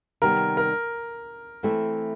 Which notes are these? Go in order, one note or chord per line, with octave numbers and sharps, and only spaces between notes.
C3 D#3 G3 B3 A#4
A#4
E3 A3 C4 E4 A4